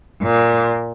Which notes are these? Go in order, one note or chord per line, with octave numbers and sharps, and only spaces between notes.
A#2